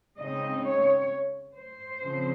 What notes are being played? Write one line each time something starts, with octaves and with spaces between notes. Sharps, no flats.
C#3 G#3 C4 D#4 D#5
C#5
C5
C#3 F3 C4